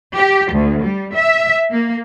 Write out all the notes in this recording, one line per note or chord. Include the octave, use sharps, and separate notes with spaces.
G4
D2
G3
E5
A#3